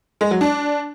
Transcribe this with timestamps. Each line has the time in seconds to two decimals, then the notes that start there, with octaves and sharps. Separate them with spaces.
0.21 G#3
0.31 F#3
0.41 D4